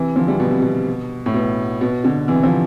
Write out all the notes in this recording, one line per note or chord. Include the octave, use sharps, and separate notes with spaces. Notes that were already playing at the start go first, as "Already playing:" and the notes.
Already playing: C3 E3
D3 F3
E3 G3
B2
C3
B2
A2
B2
B2
B2 D3
C3 E3
D3 F3